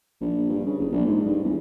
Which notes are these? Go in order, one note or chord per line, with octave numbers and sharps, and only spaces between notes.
A#1
G2
C#3
F#1
A#1
G#2
G2
E2